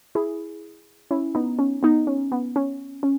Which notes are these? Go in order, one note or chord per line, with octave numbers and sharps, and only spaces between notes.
E4 G#4
C#4 E4
B3 D#4
C#4
B3 D#4
C#4
B3
C#4
C#4